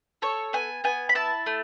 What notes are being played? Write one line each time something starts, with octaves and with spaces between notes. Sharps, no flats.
A4 C#5
B3 G#5
B3 G#5
B5
E4 A5
A3